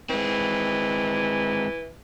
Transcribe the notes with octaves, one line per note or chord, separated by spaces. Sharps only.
E3 G#3 C4